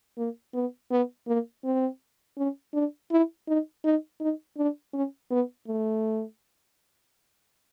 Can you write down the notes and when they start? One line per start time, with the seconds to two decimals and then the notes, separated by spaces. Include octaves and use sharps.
0.17 A#3
0.54 B3
0.91 B3
1.28 A#3
1.64 C4
2.37 C#4
2.74 D4
3.11 E4
3.48 D#4
3.84 D#4
4.20 D#4
4.57 D4
4.93 C#4
5.31 B3
5.68 A3